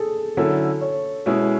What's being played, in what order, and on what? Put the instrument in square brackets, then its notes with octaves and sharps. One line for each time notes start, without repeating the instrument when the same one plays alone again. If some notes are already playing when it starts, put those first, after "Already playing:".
Already playing: [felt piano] G#4 A4
[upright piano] D3 F#3 C#4 E4 [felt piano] A4
[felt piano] C#5
[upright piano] B2 G#3 C#4 E4